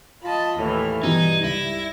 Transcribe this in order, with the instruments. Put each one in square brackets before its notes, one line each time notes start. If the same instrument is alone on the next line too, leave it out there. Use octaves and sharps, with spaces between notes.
[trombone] F4 [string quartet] D#5 A5 B5
[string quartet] D#2 E3 F6 [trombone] A2
[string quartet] G2 G#6 [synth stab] B2 E3 [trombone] G3 [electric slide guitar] D#4
[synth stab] C#2 [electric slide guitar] E4 [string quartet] A#6